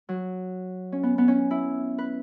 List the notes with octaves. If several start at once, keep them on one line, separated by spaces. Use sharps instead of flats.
F#3
C#4
B3
B3
C#4
E4
B4